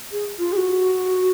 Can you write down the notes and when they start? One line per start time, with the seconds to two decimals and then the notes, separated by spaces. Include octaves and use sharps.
0.12 G#4
0.39 F4
0.52 G#4
0.57 F#4